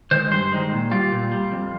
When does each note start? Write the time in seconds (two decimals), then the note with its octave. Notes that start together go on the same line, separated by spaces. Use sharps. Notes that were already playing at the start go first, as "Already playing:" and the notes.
0.11 D#3 G#3 C5
0.31 G2 C5
0.52 D#3 G#3
0.72 A#2
0.91 G3 F4
1.12 A#2
1.32 G3
1.52 F2